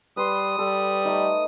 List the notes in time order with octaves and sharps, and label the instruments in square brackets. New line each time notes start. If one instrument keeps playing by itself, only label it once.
[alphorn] G3 [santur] B4 C6 [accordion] D#6
[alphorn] G3 [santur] A4
[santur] A3 D#4